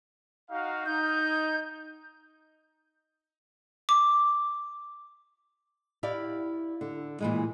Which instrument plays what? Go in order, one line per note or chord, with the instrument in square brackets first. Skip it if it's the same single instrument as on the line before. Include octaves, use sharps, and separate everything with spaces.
[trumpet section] D#4 F#4 F5
[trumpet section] D#4 [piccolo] G6
[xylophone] D6
[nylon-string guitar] E4 G4 D5 F5
D3
A#2 E3 G#3